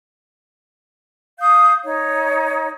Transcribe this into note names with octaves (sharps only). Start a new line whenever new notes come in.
F5 D#6 G6
D#4 C#5